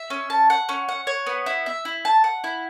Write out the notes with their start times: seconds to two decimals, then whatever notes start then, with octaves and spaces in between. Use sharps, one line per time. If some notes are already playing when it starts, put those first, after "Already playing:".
Already playing: E5
0.10 C#4
0.30 A5
0.50 F#5
0.69 C#4
0.89 F#5
1.07 C#5
1.26 B3
1.46 E4
1.66 E5
1.85 E4
2.05 A5
2.24 F#5
2.44 E4